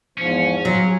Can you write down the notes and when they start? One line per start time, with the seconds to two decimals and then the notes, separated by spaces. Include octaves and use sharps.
0.18 E2 G#2 F3 C#4
0.65 F#3 F4
0.85 C#4 G#4